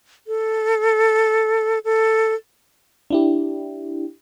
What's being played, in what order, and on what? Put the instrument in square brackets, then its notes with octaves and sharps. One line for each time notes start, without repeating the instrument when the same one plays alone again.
[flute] A4
A4
[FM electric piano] D4 E4 G4